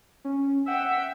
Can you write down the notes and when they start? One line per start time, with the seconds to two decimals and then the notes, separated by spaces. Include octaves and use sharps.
0.25 C#4
0.68 E5 F#5 G5 E6